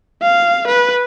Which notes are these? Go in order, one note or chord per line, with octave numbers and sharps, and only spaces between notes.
F5
B4